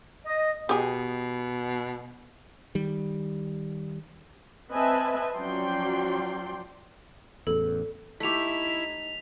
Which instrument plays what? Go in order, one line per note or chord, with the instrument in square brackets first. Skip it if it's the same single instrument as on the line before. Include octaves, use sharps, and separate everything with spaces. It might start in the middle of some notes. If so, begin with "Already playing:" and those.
[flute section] D#5
[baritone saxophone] B2 [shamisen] G4 G#4
[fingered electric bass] D#3 G3
[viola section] C4 B4 D#5 E5 G#5 A5
F3 F#3 C#4 D5 G5 C6
[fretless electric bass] A1 E2 [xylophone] A4
[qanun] A3 G4 [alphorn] D#4 [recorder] E4 [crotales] B6 F7